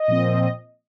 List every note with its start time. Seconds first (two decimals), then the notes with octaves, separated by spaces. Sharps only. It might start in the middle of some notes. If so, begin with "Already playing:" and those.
Already playing: D#5
0.08 A#2 F3 C4